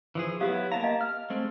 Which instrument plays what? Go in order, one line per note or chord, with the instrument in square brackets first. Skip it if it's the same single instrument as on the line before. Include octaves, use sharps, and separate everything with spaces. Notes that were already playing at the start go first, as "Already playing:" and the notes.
[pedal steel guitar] E3 F3 G#4
[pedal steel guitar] F#3 B3 E4 [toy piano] G4 F5
[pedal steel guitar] A#3 A5 A#5 [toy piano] F5
[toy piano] D#5 F5
[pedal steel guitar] F6
G#3 A3 C4